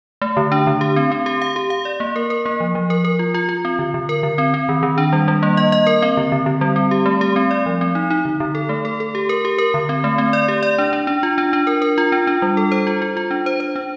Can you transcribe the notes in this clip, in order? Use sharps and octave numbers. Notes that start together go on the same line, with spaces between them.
A3
D3
D4
D3
G4
C4
C4
G4
F5
G4
F5
D5
A#3
A#4
A#4
A#3
F3
F3
A#4
A#4
F4
F4
F4
C4
D3
D3
A#4
D3
C4
C4
D#3
D#3
D4
G3
G3
A#3
D#5
D#5
A#4
C4
D3
D3
D3
G3
C4
G4
A3
G4
C4
D5
F3
C4
D#4
D#4
D3
D3
A4
A3
A4
A4
G4
A#4
G4
A#4
D3
C4
A3
C4
D5
G4
D5
D4
D4
D4
F4
D4
D4
A#4
A#4
F4
D4
D4
G3
A4
C5
F4
F4
F4
D4
C5
C5
D4